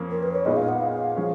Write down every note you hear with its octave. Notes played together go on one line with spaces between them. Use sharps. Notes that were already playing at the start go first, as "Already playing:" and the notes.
Already playing: F2 F3 A#3 C#4
A#4
B4
C#5
A#2 G#3 B3 D#4 D#5
F5
F#5
F5
F3 G#3 C#4